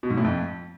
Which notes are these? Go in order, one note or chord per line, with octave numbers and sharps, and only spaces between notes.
B2
G#2
A2
F2